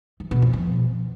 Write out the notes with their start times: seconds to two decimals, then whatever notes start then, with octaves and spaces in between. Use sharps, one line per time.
0.20 E3
0.31 B2
0.42 F2
0.53 F3